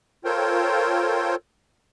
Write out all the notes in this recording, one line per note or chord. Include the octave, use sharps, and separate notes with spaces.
F4 A4 A#4 C5 C#5 G5